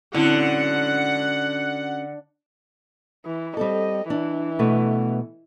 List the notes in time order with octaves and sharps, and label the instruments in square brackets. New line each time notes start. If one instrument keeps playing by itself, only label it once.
[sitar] D3 [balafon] C4 E4 [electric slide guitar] C#4 F#4 A4 [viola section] F#5
[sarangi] E3
[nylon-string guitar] G3 C4 A4 [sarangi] D#5
[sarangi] E3 [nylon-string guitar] D4
[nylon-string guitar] B2 A3 B3